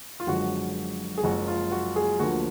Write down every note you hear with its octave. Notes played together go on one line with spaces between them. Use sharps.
F4
F#1 F#2 D3 F3 G#3 F#4
G#4
F#1 F#2 F3 G#3 F#4
F4
F#4
G#4
D2 D3 F3 A#3 F#4